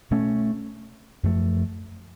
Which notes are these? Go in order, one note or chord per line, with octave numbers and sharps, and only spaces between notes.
B2 A3 C#4
F#2 F3 A3